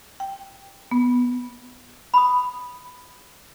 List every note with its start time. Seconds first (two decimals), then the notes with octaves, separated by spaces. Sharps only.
0.20 G5
0.91 B3
2.14 B5 D#6